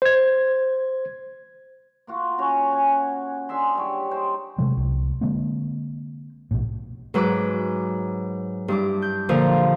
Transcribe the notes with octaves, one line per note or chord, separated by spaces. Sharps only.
C5 G#6
A#3 F4 F#4
C#4 F#4 C#5
F#5 G#5
D4 G#4 E5 C6
F#3 G3 C#5
D#4 C5 G5
C3 F#3 G#3 A3
C2
D3 G#3 A#3 C4
B1 A2
G#2 F#3 B4 D6
G2 E4 D6
G6
A#2 D3 F3